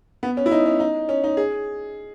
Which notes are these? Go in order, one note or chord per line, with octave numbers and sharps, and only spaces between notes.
B3
C#4
E4
D#4
C#4
D#4
C#4
D#4
G#4